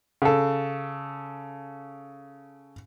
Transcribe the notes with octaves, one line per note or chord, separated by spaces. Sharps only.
C#3 A4